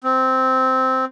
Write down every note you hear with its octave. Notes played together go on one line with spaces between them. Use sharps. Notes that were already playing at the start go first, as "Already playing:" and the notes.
C4